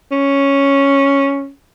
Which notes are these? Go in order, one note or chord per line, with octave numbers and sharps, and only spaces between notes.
C#4